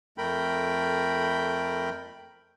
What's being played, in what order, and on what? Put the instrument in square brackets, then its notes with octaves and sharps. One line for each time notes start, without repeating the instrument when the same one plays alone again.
[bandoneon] F2 A3 A#4 G5 B5